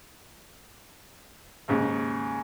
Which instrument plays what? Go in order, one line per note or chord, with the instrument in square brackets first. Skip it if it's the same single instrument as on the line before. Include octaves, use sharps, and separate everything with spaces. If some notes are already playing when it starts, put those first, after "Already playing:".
[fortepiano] D#2 G#2 C#3